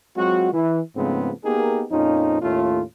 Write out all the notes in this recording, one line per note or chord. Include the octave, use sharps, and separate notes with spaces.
F#3 G#3 C4 F4 F#4
E3
G#2 C#3 F3 A3 B3 C4
A#3 B3 D#4 G4 G#4 A#4
F2 A#2 F3 C#4 D#4
D#2 A2 A3 C#4 F4